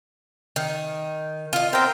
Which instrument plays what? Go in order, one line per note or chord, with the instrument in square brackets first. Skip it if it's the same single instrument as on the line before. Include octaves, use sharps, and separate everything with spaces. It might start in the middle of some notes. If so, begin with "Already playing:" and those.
[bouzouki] D#3
F4 D#5
[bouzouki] B3 G5 [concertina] C4 A#4 C5